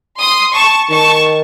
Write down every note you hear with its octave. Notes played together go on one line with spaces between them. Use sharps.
C6 D#6
A5 C#6
D#3 A5 C#6